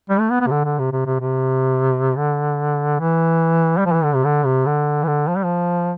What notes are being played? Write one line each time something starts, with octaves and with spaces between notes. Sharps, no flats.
G3
A3
B3
B3
C3
D3
D3
C3
C3
C3
C3
D3
E3
G3
F3
E3
D3
C3
D3
C3
D3
E3
D3
F3
G3
F3